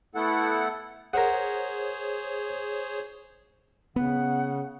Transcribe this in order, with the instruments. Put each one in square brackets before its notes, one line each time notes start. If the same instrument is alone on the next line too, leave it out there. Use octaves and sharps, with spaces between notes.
[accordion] A3 B3 E4 A4 F#5
[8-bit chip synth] G#4 C5 C#5 [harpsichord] A#4 F#5
[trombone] C#3 [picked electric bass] B3 [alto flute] F#5